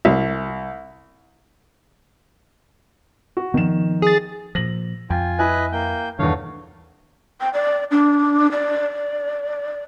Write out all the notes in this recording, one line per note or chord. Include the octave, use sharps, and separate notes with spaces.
C2
F#4
D#3 F3 B3 E7
G#4 A6
A#2 F3 A#6 F#7
F2 F4 G5 G#5
E4 B4 D#5 G#5 F#6
A#3 G5 G6
E2 G2 D#3 A3 C#5 F5
G5
D5
D4
D5